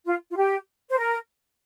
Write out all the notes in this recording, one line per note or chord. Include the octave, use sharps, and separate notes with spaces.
F4
F4
G4
C5
A#4